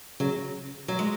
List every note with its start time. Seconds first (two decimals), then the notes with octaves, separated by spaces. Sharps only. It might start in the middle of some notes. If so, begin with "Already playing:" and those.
0.20 C#3 F#3
0.88 F#3
0.99 G#3